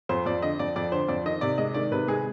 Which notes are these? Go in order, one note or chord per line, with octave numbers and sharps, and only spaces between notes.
F2 C5
F2 D5
D3 D#5
F2 D5
F2 D5
D3 C5
F2 D5
D#3 D#5
C3 D5
G#3 D#5
D#3 D5
C3 B4
G#3 G#4